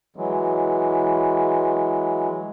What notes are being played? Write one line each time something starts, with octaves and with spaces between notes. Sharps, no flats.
E3 F#3 G#3